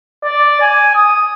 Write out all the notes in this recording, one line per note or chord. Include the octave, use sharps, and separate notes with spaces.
D5
G#5
D#6